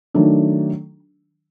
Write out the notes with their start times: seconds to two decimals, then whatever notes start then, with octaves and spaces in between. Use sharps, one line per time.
0.14 D#3 F#3 A3 D4